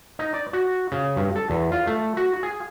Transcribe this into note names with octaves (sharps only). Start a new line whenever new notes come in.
D#4
D5
F#4
C#3
G2
A4
E2
F4
A3
F#4
G#4